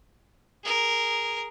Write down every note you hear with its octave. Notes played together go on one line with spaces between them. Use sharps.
G#4 A#4